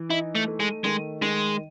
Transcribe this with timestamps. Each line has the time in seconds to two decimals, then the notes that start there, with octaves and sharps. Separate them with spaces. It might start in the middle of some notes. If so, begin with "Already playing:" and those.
Already playing: E3
0.10 D#4 E4
0.35 A3
0.48 A3
0.60 G#3
0.84 D#3 G#3
1.22 D#3 G#3